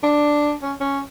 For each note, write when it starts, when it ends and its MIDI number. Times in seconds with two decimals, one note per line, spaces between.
0.03 0.53 62
0.62 0.73 61
0.80 1.00 61